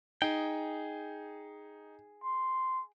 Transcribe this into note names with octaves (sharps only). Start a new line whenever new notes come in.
D#4 G#4 G5
C6